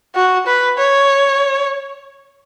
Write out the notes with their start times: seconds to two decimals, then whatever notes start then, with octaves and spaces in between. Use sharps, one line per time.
0.15 F#4
0.47 B4
0.78 C#5